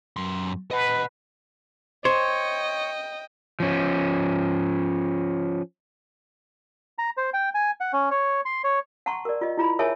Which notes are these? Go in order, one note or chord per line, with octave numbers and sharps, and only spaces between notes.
F#2 C6
B4 D#5 F#5
C5 C#5 D#5 G5
F3 C#4
A#5
C5
G5
G#5
F#5
C#4
C#5
C6
C#5
F#5 A5 A#5 C6 C#6
A#4 D5
F4 D#5
E4 F4 A#5 B5
G#4 A#4 C#5 E5 G#5 A5